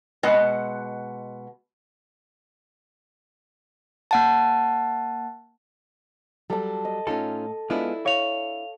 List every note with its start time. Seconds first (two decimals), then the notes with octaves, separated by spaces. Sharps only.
0.23 B2 G#3 D#5 F#5
4.11 A#3 F#5 A5
6.50 F#3 G3 A4 A5
6.85 D#5
7.07 A2 C#4 D#4 F4 A4
7.70 G#3 B3 D4 E4 F4
8.06 C#5 F5 F7